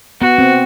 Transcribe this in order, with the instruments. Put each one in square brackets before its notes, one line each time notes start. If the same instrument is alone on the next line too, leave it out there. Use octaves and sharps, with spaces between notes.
[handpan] B3 [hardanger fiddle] F#4
[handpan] C4